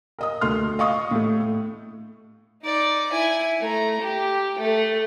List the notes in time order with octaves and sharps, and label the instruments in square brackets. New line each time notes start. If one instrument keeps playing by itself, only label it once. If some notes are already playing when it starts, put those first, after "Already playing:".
[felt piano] A#4 D#5 D#6
D2 A3 C6 F6
D#5 F5 C#6 D#6
A2 A3
[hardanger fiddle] D#4 D5
E4 G#5
A3 A#5
G4
A3 A4